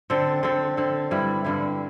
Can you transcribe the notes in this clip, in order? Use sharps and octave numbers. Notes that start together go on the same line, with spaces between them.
D3 C4 A4
D3 C4 A4
D3 C4 A4
G2 D3 G3 E4
G2 D3 G3 E4